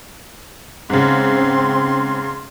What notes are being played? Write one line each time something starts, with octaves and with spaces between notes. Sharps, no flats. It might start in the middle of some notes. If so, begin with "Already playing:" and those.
G#2 C#3 C4 C6